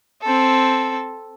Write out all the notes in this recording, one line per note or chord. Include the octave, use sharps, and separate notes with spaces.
C4 A4